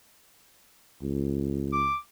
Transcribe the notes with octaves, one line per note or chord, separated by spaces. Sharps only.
C#2
D6